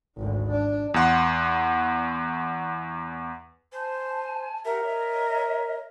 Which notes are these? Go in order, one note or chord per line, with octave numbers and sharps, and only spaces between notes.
G#1 D2
D4
E2 F#5 C6
C5 G#5 A5
G4 A#4 E5 F#5
C#5 D#5 E5